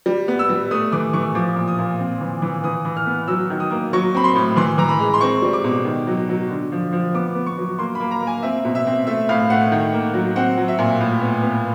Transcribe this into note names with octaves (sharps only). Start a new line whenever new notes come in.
G3
B3
E6
G3
A3 D#6
E3 D6
E3 C#6
F3 D6
A#2
D#6
A#2
C4
E3
E3
E3 D#6
E3
F6
B3
F#3 E6
D#3
D#6
A#3
F#3 C#6
C4 B5
C6
A2
E3 C6
E3 A#5
B5
G#3
C6
C4 C#6
G3
D6
B2
D#3
F#3
F#3
D3
F3
F3
B3 D6
B3
C#6
F#3
A#3 C6
A#3 B5
A#5
A#3
G#5
C4 E5
B2
E5
C4
A3 E5
A2 F5
A3 F#5
D#3
A#3
F#3
C4 F#5
F#3
E5
A#2
A2
B3
B3